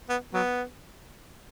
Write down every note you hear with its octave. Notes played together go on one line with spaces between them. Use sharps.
B3
F#3 B3